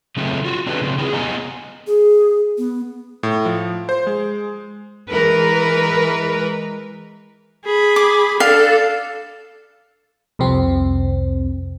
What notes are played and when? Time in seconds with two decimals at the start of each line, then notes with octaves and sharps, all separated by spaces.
0.17 C#3 F#3 A3 C4 D#4
0.45 F4 F#4
0.67 C4 D4 G4 A4 B4
0.81 C#3 F#3 C4
0.98 C4 E4 G#4
1.13 B3 G4 D#5 G#5 A#5
1.87 G#4
2.58 B3
3.23 A2
3.45 F3
3.89 C5
4.07 G#3
5.11 E3 G#3 A#4 B4
7.65 G#4 B5
7.96 D6
8.40 D4 A4 F5
10.39 C2 F2 C3 C4